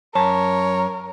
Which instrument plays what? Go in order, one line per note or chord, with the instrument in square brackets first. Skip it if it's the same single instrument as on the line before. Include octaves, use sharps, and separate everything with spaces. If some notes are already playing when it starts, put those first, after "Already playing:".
[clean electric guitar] F#2 A5 [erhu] A#4 [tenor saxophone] C#5